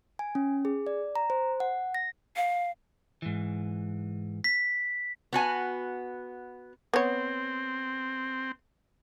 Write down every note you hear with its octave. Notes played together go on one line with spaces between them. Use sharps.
G#5
C#4
G#4
D5
A#5
C5
F#5
A#6
F5
G#2 E3
B6
B3 F#4 G#5
B3 C4 C#5